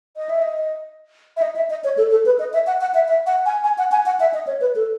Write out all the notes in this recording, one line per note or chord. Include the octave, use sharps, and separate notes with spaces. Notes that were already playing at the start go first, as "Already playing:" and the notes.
D#5
E5
D#5
E5
D#5
E5
D#5
C#5
A4
A4
B4
D#5
E5
F#5
F#5
E5
E5
F#5
G#5
G#5
F#5
G#5
F#5
E5
D#5
C#5
B4
A4